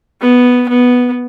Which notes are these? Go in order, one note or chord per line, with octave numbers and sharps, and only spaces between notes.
B3
B3